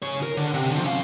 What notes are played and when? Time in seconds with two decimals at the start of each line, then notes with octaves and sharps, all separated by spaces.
0.02 C#3 C#5
0.23 A#4
0.37 D3
0.54 C3
0.71 D3 F3
0.85 C#4 F5